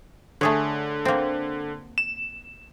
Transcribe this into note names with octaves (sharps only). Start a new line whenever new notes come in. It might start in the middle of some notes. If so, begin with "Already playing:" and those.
D3 A3 G#4 C#5
A#3 C4
E7